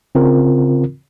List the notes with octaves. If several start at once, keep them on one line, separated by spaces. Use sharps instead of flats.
C#3 C4 F4 A#4